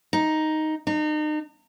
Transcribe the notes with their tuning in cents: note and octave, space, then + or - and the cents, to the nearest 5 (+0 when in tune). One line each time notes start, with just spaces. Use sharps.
D#4 +0
D#4 -35